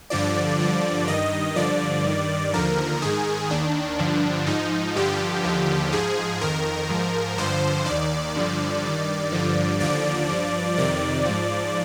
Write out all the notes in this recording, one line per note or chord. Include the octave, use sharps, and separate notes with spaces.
G2 D3 F3 D5
G2 D3 F3
G2 D#3 D#5
G2 D3 F3 D5
G2 D#3
D#2 D3 F3 A#4
G#2 D#3 G#4
D#2 D#3 D4
G2 D3 F3
G#2 F3 D#4
G2 D3 F3 G4
D#2 D3 F3
G#2 F3 G#4
F2 D#3 A#4
G#2 F3
G2 D3 F3 C5
D#3 D5
D#2
G2 D3 F3
G2 D#3
G2 D3 F3
D#2 D3 F3 D5
G2 F3
F2 C3 D#3 D5
G#2 F3